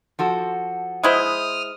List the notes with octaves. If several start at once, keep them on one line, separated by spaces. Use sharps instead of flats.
F3 F#4 A4
G#3 E4 C5 D#6 F6